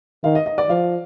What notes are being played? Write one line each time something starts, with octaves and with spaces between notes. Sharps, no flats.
D#3 F5
D#5
D#5
D5
F3 F5